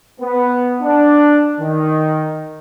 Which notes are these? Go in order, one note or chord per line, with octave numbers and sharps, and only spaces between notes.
B3
D4
D#3